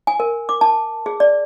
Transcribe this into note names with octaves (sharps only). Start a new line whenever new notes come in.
G#5
A#4
D6
A5
G#4
D5